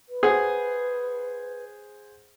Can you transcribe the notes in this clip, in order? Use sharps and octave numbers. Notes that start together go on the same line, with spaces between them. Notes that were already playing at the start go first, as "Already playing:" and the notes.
B4
G#4 C5 F#5